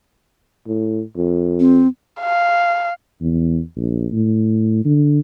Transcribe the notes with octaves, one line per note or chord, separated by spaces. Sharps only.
A2
F2
C4
F5
E2
A#1
A2
D3